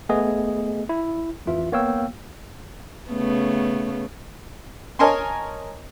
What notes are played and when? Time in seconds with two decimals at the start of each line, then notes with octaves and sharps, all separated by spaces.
0.09 A3 B3 G#4 D#5
0.89 E4
1.46 A1 F2 E3 F4 E5
1.72 A#3 B3 C#5 F5 G5 E6
3.10 C#3 A3 B3
4.99 A#4 C#5 D#5 G#5 A5 C6